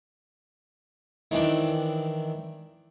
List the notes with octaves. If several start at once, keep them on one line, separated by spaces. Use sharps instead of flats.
D#3 E3 C4 D4